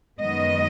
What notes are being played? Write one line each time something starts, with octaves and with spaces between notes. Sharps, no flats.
F#2 D#3 G#3 B3 D#5